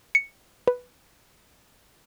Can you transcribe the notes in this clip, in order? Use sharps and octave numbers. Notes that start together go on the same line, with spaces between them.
C#7
B4